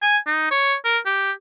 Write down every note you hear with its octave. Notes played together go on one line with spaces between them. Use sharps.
G#5
D#4
C#5
A#4
G4